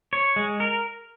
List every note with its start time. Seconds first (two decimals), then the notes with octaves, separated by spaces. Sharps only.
0.13 C#5
0.36 G#3
0.60 A#4